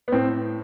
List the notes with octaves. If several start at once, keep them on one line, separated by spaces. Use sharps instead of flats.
B3
A2 C4